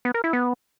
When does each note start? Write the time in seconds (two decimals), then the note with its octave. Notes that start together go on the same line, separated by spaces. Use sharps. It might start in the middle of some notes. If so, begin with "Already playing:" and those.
0.05 B3
0.14 A#4
0.24 E4
0.33 B3